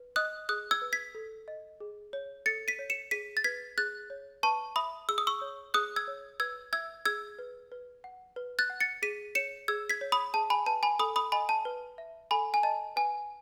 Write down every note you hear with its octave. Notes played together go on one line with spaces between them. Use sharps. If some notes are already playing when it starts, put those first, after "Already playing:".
Already playing: B4
D#5 D#6 F#6
G#4 D#6 F#6
E6 G#6
B4
G#6 B6
A4
D#5
G#4
C#5
A4 A6 C#7
B6 D#7
C#5
C#7 E7
G#4 B6 D#7
A6
B4 G#6 B6
G#4 F#6 A6
C#5
B4 A5 C#6
E5 B5 D#6
G#4 E6
D#6
C#6 E6
C#5
G#4 D#6 F#6
E6 G#6
C#5
B4 E6 G#6
E5 E6 G#6
G#4 E6 G#6
B4
B4
F#5
B4
F#6 A6
F#5
A6 C#7
G#4 B6 D#7
C#5 C#7 E7
G#4 E6 G#6
G#6 B6
C#5
B5 D#6
G#4 A5
G#5 B5
B4 A5
G#5 B5
A4 B5 D#6
B5 D#6
D#5 G#5 B5
A5
B4
E5
A4 G#5 B5
G#5
D#5 A5
B4 G#5